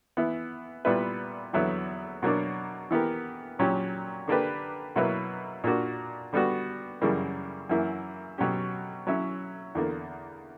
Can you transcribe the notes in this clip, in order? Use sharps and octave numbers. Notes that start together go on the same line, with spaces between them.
E3 B3 E4
A#2 G3 B3 E4 B4
E2 D3 F#3 B3 E4
B2 F#3 A#3 D4
E3 B3 E4 G4 A#4
A#2 F#3 C#4 G4
D3 A#3 D4 G4 B4
B2 F#3 A#3 E4 B4
A#2 A#3 D4 F#4
D3 G3 B3 F#4
F#2 C#3 E3 G3 A#3
F#2 E3 A#3 E4
B2 F#3 C#4 G4
F#3 C#4 E4
E2 D3 A#3